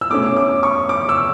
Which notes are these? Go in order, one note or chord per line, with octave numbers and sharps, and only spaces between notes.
E6
B2 A3 C#4 D6
D6
C#6
D6
E6